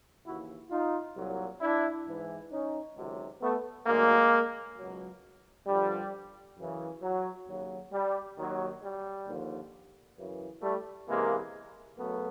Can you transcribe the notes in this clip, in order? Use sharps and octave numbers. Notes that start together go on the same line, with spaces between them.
D#2 C#3 E3 E4 F#4
D#4 F4
C2 A#2 F#3
D4 E4
G#2 E3
C#4 D#4
C#2 C3 D#3 F#3
A3 B3
D2 D3 F#3 G#3 A#3
C#2 B2 F#3
G2 D3 F3 G3
F#2 C#3 E3
F#3
D#2 C#3 F#3
G3
D#2 D#3 F#3
G3
D#2 D3 F3
F#2 C#3 E3
G3 A3
E2 C3 E3 G#3 A#3
F#2 C#3 F#3 A3 B3